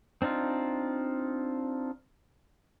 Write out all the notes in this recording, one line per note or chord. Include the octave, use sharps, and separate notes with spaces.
C4 D4 D#4 F4